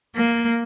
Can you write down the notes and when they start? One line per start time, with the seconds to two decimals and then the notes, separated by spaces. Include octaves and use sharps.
0.16 A#3